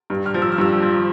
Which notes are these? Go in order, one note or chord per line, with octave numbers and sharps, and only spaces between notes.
G2
F6
F3
E6
F6
G2 E6
F3